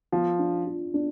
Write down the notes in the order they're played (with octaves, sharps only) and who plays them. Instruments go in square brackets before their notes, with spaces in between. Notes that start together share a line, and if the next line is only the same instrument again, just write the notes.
[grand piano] F3 [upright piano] B3
[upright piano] D4
F4
D4